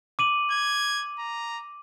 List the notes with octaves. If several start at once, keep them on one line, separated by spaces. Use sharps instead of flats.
D6 D#7 F#7
G#6
A#5